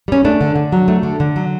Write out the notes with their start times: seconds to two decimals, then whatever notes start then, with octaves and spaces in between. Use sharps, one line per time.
0.08 G3 C#4
0.25 A3 D4
0.41 D3
0.56 D3
0.72 F#3
0.88 A3
1.03 D3
1.20 D3
1.36 F#3